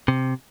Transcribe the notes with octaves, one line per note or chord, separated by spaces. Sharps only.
C3